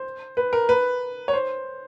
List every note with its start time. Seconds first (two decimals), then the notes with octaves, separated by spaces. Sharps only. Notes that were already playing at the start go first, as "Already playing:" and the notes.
Already playing: C5
0.37 B4
0.53 A#4
0.69 B4
1.28 C#5
1.33 C5